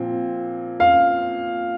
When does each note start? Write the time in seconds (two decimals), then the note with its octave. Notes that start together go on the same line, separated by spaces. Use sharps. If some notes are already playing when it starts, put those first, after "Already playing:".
Already playing: A#2 F3 C4
0.80 F5